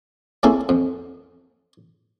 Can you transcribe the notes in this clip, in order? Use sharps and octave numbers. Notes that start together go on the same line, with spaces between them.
G#3 A#3 C4 C#4 E4 A4
F2